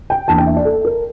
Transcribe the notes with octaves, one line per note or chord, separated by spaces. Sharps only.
G5
E2 E3 A#3 D4 A5
G5
E5
D5
A4
A#4